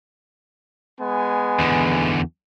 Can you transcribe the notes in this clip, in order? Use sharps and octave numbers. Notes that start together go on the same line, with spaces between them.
G#3 B3 G#5
E2 D3